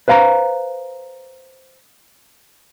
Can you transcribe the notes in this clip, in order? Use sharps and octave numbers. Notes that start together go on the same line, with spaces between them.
B4 C5 F5 A5 A#5